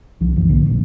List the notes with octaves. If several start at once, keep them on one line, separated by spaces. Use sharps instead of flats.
C2 F3
C2 F#2 D3 E3
B1 A2 D3 A#3
D1 G1 A#2 F#3